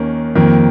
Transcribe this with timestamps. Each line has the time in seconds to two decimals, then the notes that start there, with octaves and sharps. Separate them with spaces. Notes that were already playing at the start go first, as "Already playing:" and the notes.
Already playing: D#2 D#3 A#3 C#4
0.35 F2 D#3 A#3